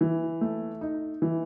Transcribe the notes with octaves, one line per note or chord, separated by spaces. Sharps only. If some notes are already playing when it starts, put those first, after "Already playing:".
E3
A3
D#4
E3